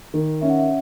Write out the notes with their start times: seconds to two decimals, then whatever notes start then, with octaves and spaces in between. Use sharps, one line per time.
0.14 D#3
0.41 C#4 E5
0.50 F#5
0.58 E5